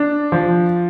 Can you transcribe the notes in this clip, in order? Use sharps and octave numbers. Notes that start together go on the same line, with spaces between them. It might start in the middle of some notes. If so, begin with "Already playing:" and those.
Already playing: D4
F3